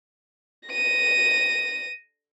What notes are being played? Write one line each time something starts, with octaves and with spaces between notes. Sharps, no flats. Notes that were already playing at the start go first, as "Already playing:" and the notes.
A#6 D#7